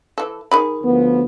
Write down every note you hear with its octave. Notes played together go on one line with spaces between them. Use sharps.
E3 A4
D#3 G#4 B5
D2 F3 B3